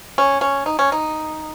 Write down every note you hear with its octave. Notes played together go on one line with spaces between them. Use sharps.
C#4
C#4
D#4
C#4
D#4